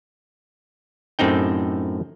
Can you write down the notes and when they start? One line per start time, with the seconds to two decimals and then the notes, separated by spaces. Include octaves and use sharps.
1.19 F#2 A2 C4 D#4 G5